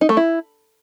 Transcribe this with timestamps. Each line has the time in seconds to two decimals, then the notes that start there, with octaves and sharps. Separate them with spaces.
0.01 D#4
0.09 A3
0.17 E4